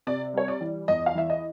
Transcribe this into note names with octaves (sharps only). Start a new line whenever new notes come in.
C3 D5
G3 C#5
D5
E3
E2 D#5
F5
E3 E5
D#5